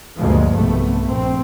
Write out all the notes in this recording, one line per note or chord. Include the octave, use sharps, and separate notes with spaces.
D2 G2 A#2 F3 G#3 A#3
B1 C3 A3 B3
A#1 A#2 C4